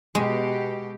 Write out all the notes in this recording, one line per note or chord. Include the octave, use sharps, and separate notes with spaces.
B2 G#3 G4